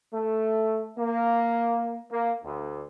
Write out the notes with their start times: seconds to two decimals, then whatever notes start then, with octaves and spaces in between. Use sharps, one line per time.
0.13 A3
0.98 A#3
2.10 A#3
2.43 D2